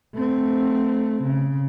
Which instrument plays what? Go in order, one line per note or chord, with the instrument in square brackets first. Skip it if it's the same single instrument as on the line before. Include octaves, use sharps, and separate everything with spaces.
[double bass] A3 C4
C#3